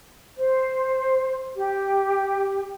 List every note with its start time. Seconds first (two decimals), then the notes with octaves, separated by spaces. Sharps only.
0.38 C5
1.55 G4